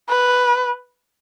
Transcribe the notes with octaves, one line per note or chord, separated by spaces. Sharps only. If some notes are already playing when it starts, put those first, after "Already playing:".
B4